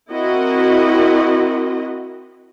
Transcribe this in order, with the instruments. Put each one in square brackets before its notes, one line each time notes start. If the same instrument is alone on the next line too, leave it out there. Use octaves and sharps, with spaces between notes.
[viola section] C4 E4 F#4 A#4 D#5